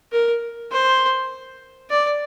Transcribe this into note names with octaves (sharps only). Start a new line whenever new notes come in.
A#4
C5
D5